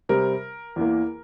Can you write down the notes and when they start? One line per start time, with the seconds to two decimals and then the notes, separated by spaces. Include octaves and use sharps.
0.09 C3 G3 C4 A#4
0.76 E2 E3 A#3